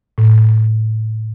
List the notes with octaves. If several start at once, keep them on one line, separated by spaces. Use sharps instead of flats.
A2